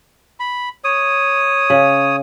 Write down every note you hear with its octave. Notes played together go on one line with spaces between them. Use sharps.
B5
C#5 D#6
C#3